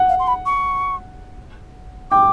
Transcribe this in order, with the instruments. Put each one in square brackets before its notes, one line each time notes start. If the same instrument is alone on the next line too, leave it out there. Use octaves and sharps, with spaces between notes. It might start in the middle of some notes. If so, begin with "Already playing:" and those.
Already playing: [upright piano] F#5
[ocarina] F5
C6
B5
C#6
[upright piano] G5 [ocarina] D6